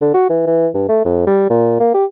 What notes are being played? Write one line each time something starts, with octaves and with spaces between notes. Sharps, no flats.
D3
F#4
E3
E3
G2
A3
F2
G3
A#2
A#3
G4